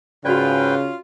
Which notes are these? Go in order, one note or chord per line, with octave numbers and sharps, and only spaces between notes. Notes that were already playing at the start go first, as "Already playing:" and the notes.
G#2 C#3 C#4 F4 F#4 B4 D5 G5